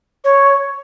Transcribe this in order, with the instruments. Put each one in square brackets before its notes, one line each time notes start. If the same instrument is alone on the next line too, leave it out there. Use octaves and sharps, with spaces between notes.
[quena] C#5